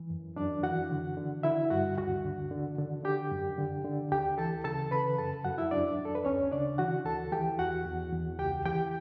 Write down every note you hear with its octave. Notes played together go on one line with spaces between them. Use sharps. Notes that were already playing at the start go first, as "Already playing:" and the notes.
Already playing: E3
F#2
F#2 D4 D5
E3 F#4 F#5
D3
D3
D3 E4 E5
G2 F#4 F#5
D2 F#4 F#5
D3
D3
D3
D3 G4 G5
F#2
D3
D3
D2 G4 G5
E3 A4 A5
C#3 A4 A5
C#3 B4 B5
F#2 A4 A5
F#2 F#4 F#5
E4 E5
F#2 D4 D5
F#2
A4
B4
D2 C#4 C#5
C#3 D4 D5
E3 F#4 F#5
D2 A4 A5
E3 G4 G5
E2 F#4 F#5
E2
E2
C#2 G4 G5
E3 G4 G5